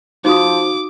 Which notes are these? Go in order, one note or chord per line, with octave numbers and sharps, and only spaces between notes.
F3 D#4 F#4 D6 D#6